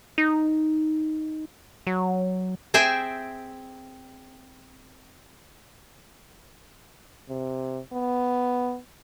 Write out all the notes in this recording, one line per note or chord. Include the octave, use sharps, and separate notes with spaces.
D#4
F#3
C4 G#4 E5 G5 G#5
C3
B3